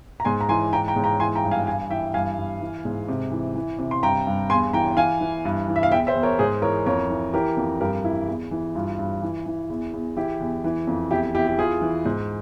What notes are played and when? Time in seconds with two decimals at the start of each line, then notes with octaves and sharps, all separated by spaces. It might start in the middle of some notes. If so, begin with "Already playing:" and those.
0.20 A#5
0.25 G#2 G#5 C6
0.41 A#5
0.49 E3 G#5 C6
0.72 E3 G5 A#5
0.88 G5 A#5
0.96 G#2
1.04 G5 A#5
1.19 E3 G#5 C6
1.35 G5 A#5
1.43 G2
1.51 F5 G#5
1.67 G2 F5 G#5
1.90 E3 E5 G5
2.14 G2 F5 G#5
2.38 G2
2.61 E3
2.85 G#2
3.09 C3
3.31 E3
3.55 E3
3.79 C3
3.91 C6
4.03 G2 G5 A#5
4.27 G2
4.50 E2 G#5 C6
4.73 E3 G5 A#5
4.97 E3 F5 G#5
5.21 E3
5.45 G2
5.68 E3
5.76 E5
5.83 F5
5.92 E2 E5 G5
6.07 C5 E5
6.15 E2
6.23 A#4 C#5
6.39 G#2 G#4 C5
6.62 E3 A#4 C#5
6.86 F2 A#4 C#5
7.10 E3
7.33 E3 G4 A#4
7.57 F2
7.80 G2 G4 A#4
8.04 E3 E4
8.28 E2
8.51 E3
8.75 G2 F4
8.99 G2
9.22 E3
9.46 E3
9.70 E2
9.93 E2
10.17 E3 E4 G4
10.40 E2
10.64 E3
10.87 F2
11.11 E2 E4 G4
11.34 E2 E4 G4
11.48 G4
11.58 E3 F4 G#4
11.82 E3
12.05 G#2